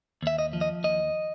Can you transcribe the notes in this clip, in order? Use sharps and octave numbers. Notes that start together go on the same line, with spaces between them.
D#2 E5
D#5
F3
D#5
D#2 D#5